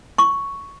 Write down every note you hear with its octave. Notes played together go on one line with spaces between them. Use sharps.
C#6